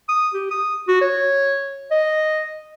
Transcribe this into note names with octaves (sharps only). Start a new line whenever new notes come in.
D#6
G4
D#6
F#4
C#5
D#5